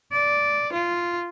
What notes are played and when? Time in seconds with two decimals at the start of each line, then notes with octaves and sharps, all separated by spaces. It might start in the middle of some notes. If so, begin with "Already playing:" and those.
0.12 D5
0.72 F4